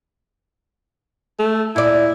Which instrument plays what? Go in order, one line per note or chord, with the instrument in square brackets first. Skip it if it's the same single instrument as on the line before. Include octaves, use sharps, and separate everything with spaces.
[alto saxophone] A3
[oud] A#2 D5 [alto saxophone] E4